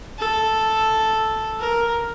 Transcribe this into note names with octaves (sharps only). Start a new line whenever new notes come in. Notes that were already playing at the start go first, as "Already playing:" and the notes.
A4
A#4